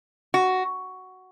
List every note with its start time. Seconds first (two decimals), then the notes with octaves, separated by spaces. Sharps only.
0.34 F#4